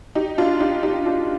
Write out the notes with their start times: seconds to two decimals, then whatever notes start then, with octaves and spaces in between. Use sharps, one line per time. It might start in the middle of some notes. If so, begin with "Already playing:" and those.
0.15 D#4 G4
0.38 D4 F4
0.60 D#4 G4
0.83 D#4 G4
1.06 D4 F4